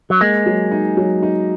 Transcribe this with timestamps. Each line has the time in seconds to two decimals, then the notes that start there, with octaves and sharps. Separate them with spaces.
0.10 F#3
0.20 G#3 A#3
0.46 F#3
0.71 D#4
0.97 F#3
1.23 D#4